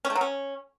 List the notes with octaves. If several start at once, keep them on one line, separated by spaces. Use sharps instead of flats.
C#4
A3
F#3
C#4